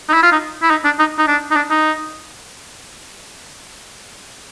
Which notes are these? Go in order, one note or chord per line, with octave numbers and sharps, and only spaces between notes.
D#4
E4
F4
D#4
E4
D#4
D4
D#4
D#4
D4
D#4
D4
D#4